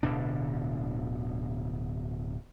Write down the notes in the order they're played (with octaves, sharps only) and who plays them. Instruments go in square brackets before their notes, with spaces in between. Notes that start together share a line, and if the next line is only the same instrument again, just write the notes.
[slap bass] D1 B2 D3 D4